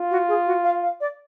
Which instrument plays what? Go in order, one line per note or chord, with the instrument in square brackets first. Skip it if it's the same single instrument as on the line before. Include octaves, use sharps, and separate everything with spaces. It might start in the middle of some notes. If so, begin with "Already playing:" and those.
Already playing: [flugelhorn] F4
[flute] F#4
G#4
F#4
F5
F5
D5